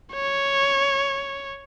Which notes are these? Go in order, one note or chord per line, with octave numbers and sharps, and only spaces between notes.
C#5